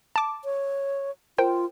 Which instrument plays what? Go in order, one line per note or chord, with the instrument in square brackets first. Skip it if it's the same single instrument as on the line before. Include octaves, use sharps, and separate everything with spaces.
[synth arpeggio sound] A5 D6
[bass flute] C#5
[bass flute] F4 [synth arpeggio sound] A#4 C5 G5